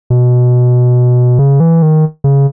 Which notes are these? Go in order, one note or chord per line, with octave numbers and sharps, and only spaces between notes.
B2
C#3
E3
D#3
C#3